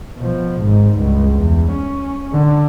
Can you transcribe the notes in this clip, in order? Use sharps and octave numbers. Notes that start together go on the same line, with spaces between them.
B2 F3
G#1 G#2
C#2 G2
E2
C#4
D3